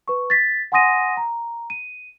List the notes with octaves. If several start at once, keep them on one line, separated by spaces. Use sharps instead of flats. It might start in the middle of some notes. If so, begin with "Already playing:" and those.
B4 C#6
A6 B6
F#5 G#5 C6 D#6 A#6 D#7
A#5
D#7